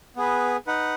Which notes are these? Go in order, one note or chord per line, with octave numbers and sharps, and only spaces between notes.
B3 G#4 B4
D#4 B4 F#5